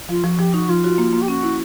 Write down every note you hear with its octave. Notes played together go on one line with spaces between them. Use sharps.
F3 F4
F3 F#4
F3 G4
D#4 F#4
F3 F4
F#4
A#3
A#3
G4
C#4 F#4
E4